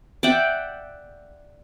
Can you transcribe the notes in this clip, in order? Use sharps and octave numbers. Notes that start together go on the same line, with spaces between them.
D5 E5 F#5 G5